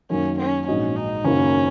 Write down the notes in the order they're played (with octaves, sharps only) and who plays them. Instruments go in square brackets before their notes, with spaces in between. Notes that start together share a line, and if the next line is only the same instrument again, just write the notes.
[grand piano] F#2 D#3 F#3 A#3 D#4 [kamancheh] C#4
[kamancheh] C#4
[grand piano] A#1 G#2 G#3 F#4 D#5 [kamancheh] C#4
[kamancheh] D#4
[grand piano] F#1 F#2 D#3 A#3 F#4 [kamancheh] C#4